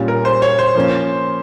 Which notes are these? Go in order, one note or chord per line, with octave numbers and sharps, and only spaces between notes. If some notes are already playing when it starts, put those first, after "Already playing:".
Already playing: A#2 G3 C#4 F4
A#4
C5
C#5
C5
F3 A#3 C#4